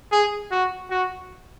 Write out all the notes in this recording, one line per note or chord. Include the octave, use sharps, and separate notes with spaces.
G#4
F#4
F#4